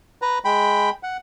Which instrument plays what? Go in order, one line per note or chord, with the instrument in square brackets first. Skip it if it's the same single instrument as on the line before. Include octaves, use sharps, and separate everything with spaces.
[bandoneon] B4 A#5
G#3 G5 B5
F#5